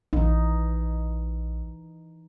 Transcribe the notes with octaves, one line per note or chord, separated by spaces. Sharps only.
A#1 E3 D#4